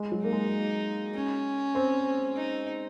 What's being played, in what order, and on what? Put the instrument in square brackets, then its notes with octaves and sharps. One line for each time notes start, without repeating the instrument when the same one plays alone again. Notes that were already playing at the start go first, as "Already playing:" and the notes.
Already playing: [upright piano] G#3
F#3
[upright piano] A#3 [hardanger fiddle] D#4
[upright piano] G#3
[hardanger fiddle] C#4
[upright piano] C4
[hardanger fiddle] D#4